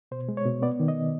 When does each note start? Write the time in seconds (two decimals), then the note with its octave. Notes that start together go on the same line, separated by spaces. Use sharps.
0.11 B2 C5
0.29 G#3
0.37 C#5
0.45 B2
0.62 B3 D5
0.80 D#3
0.88 D#5